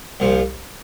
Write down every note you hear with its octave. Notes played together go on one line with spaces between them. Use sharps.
C2 A#2 F3